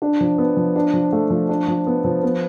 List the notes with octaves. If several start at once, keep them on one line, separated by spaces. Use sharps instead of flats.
D4
F3
B3
F3
D4
F3
A3
F3
D4
F3
B3
F3
B3